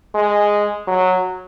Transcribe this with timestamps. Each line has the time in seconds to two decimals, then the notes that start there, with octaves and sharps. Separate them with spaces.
0.15 G#3
0.87 F#3